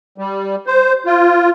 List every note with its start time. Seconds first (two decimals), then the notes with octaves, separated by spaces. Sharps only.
0.18 G3
0.67 C5
1.06 F4